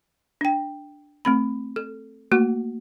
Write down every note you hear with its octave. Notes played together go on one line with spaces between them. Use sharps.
D4 G5
A3 C4 B5
A4
A3 A#3 F#4 F#5